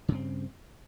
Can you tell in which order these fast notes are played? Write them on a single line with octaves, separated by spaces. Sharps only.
C#3 G2 C4